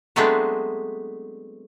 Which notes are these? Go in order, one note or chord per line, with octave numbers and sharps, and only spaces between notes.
F#3 G#3 A3 B3 C4 D4